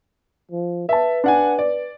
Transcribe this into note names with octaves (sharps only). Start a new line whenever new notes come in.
F3
B4 E5 A5
D4 F#5 G#5
D5